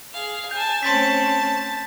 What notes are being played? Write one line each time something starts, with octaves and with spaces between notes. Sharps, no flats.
G#4 F5
G#5 A5 G6
A3 C4 C#4 A5 C6 A6 B6